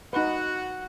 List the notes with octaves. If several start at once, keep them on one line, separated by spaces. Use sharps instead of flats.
D#4 F#4 B4 F#5